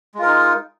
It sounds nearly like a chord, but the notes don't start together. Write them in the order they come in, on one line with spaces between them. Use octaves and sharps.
G#3 F4 A#4 D#4